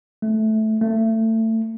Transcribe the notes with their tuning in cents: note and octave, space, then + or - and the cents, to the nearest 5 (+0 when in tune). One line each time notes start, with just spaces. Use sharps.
A3 -10
A3 +25